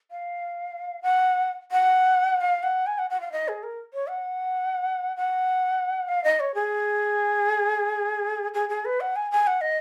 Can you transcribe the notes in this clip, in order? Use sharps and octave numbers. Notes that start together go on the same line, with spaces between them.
F5
F#5
F#5
F5
F#5
G#5
F#5
F#5
F5
D#5
G#4
A#4
C#5
F#5
F#5
F5
D#5
C#5
G#4
G#4
G#4
B4
F#5
G#5
G#5
F#5
D#5